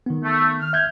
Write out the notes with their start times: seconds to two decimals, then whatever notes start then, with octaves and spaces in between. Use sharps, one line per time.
0.06 D#3 B3
0.24 A3
0.60 F6
0.73 E5 G6 G#6